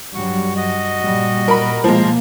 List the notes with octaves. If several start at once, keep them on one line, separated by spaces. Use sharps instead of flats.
G2 F#3 G3 F#4 C#6
F#4 D#5
A#2 G3
A#4 B5
B2 F3 G#3 A#3 A#5 C6